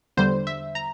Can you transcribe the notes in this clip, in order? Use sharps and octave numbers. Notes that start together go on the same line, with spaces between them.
E2 D3 G3 C5
E5
A#5